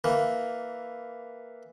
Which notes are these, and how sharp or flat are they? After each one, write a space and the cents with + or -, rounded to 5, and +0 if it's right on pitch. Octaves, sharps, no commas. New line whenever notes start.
E3 +0 A#3 +0